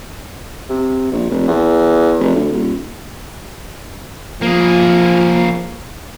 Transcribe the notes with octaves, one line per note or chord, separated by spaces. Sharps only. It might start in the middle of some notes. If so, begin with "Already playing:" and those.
C3
A#1
F1
E2
F1
D2
D#1
F3 A#3 G#4